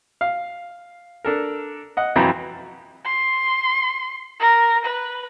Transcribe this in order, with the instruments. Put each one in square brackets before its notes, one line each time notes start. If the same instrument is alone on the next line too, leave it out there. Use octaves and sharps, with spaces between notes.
[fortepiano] F5
D4 A4 A#4
D#5 F#5
F2 E3 F#3 G5 A#5 B5
[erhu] C6
A#4
B4